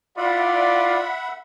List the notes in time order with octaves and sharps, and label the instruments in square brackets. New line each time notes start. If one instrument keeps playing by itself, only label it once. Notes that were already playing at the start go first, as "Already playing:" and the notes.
[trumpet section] E4 F4 D5 [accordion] E5 F#5 B5